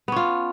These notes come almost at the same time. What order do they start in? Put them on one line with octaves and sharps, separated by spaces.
B3 C#4 F4